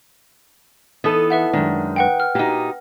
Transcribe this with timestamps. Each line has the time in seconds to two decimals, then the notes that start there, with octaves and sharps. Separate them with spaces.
1.04 E3 B3 D#4 A4
1.30 B4 E5 F#5
1.53 F#2 D#3 G#3 D4
1.96 B4 F#5 G5
2.20 F6
2.35 A#2 D#4 F#4 G4